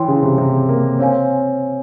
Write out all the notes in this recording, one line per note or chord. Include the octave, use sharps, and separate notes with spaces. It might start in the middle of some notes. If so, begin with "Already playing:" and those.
Already playing: E3 C#5 G5 C6
C#3
C3
C3
A#3
C4 C#5 F5 G#5